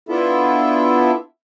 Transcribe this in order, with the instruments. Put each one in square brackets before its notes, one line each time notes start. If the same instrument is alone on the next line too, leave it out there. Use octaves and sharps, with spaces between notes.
[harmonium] B3 D4 E4 F4 A4 E5